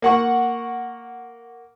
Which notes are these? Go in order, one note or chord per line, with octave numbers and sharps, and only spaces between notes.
A#3 F#5 C#6